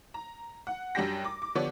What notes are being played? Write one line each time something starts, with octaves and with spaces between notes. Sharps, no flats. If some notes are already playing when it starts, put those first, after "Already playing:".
A#5
F#5
F#2 G3 D4 G4 G5 A#6
D6
D6
D3 F3 B3 G4 C#5 D5